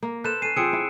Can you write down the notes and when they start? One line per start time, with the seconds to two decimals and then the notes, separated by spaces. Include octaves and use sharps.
0.03 A#3
0.24 A4 B4 C5 F#6 E7
0.42 C#4 A4 C7 D#7
0.56 F3 C4 G#4 E6 C#7 D7
0.73 E4